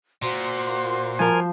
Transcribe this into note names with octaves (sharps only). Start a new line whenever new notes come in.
A#2 F#4 C5 C6
F3 A#4 G#5